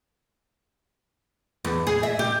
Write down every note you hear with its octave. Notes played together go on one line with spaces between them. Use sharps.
E2
G#4
E5
G4